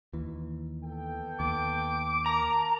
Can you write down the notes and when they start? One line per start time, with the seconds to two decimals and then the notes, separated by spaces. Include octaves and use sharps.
0.13 D#2 E3
0.84 B3 A4 G5
1.40 D#2 D6
2.26 A#4 A5 A#5